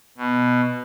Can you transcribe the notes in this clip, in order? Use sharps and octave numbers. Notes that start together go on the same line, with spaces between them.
B2